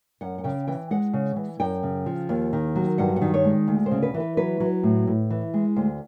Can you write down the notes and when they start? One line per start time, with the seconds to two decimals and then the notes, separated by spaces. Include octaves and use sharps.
0.21 F#2 F#5
0.38 F#5
0.44 C#3 G5
0.67 E3 G5
0.91 G#3 F#5
1.13 C#3
1.36 E3
1.60 F#2 G5
1.83 C#3
2.06 F3
2.29 D#2
2.53 D#3
2.76 F#3
2.98 G2 F#5
3.16 F#5
3.21 D#3
3.34 C#5
3.44 G#3
3.67 D2
3.86 C5
3.91 C#3
4.02 B4
4.14 E3
4.20 B4
4.37 F#3 B4
4.60 F#3
4.83 A2
5.07 A2
5.30 E3
5.54 G#3
5.76 D2 C5